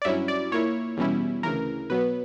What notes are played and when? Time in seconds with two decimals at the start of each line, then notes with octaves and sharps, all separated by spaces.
0.02 D5
0.05 G2 F#3 C#4 E4 E5
0.28 D5
0.52 A#2 A#3 E4 C#5
0.97 E2 B2 G3 C#4 E4
1.43 D2 C#3 E3 A#4
1.90 B2 F#3 B3 B4